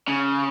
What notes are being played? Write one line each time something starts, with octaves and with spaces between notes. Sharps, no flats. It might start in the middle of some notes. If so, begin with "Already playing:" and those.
C#3